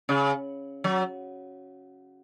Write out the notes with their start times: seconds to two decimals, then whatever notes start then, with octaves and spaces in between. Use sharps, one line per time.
0.09 C#3
0.84 F#3